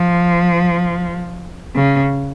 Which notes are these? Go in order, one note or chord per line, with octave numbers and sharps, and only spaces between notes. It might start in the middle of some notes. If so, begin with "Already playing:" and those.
Already playing: F3
C#3